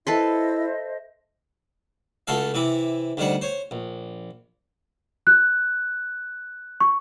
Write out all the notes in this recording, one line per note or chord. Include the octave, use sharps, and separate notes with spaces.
E4 A4 B4 C5 D#5 E5 C6
C#2 A3 F#4 A4 F5
C3 E3 E4 D6
D2 D#3 G3 C5 F#5
C5 C#5
A#1
F#6
C#6